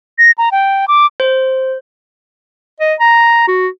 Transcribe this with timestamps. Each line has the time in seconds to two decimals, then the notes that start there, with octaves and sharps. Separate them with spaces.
0.18 A#6
0.38 A#5
0.52 G5
0.88 D6
1.20 C5
2.80 D#5
3.00 A#5
3.48 F#4